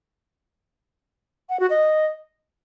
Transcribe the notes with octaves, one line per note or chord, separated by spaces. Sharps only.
F#5
F#4
D#5